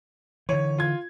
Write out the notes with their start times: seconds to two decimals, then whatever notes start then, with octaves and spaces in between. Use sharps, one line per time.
0.49 D3 E3 C#5
0.78 F4 G#6